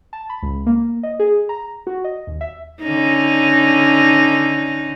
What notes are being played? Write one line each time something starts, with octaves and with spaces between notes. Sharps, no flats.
A5
B5
C#2
A#3
D#5
G#4
A#5
F#4
D#5
D#2
E5
D3 C#4 D#4